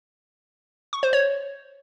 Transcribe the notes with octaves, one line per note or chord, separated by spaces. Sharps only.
C#6
C5
C#5